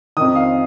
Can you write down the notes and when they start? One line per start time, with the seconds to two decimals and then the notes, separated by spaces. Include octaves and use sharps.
0.17 F2 D#3 D#6
0.35 F5